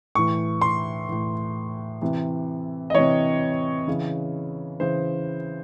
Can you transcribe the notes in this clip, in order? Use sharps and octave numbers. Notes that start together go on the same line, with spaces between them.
A2 E3 C#6
C6
A2 E3
C3 E3
D#5
C3 E3 C#5
C#3 E3
C#3 E3 C5